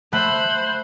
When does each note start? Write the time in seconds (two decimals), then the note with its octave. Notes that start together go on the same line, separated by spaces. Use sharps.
0.13 A3 C5 F#5 B5